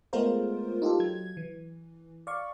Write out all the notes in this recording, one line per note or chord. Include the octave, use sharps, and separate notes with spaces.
G#3 A3 B3 F4 A#4 C5
D#4 F4 G4 A4
F#3 G#6
E3
D5 F5 C#6